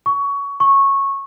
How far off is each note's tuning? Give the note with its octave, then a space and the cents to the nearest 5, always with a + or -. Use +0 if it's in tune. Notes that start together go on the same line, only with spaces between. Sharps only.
C#6 +20
C#6 -10